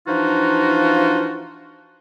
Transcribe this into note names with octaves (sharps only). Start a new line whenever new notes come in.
E3 F3 D4 D#4 F4 F#4